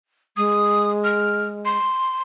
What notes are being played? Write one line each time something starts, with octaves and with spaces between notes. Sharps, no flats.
G#3 D#6
F6
C6